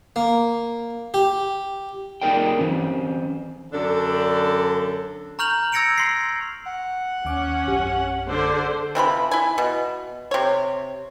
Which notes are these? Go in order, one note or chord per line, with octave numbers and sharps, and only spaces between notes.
A#3
G4
A#3 D#4 G#4 A#4 D5 G5
E3 C4 C#4
F#2 D3 D4 A4
A#5 C#6 F6 G6 F7 F#7
E6 G#6 A#6 C#7 D7 F7
C6 C7
F#5
D#2 C#4 D6
A#1 F#2 G4
D3 C5
C3 E3 F3 B5
E4 G#5
B2
C3 C#5